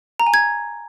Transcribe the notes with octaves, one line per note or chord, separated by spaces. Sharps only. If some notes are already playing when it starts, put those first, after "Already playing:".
A#5
G#5
G#6